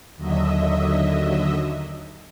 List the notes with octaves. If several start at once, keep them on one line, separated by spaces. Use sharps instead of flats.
D#2 D3 F#3 D#5 E5